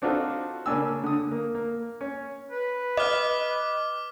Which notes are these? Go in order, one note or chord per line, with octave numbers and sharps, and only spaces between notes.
C4 D4 D#4 F4 F#4 A4
C#3 A#3 C#4 D4 G#5 E6
D3 D#6
A#3
A#3
C#4
B4
D#5 D6 F6